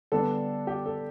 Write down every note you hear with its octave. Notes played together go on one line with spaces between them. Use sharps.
D3 G3 B3 D4 A4
G4
A4